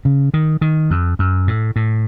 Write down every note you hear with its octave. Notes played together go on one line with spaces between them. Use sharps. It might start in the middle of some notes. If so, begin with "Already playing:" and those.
C#3
D#3
D#3
F2
F#2
A2
A2